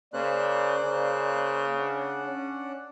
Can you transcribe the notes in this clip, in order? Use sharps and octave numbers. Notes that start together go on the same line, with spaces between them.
C#3 A#3 C5 D5 F#6
C#3
D4 F#5
C#4